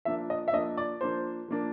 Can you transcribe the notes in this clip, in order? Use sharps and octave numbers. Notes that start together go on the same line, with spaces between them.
F3 A#3 D4 E5
D#5
E5
F3 A#3 D4 D#5
D5
F3 A#3 D4 C5
F3 A#3 D4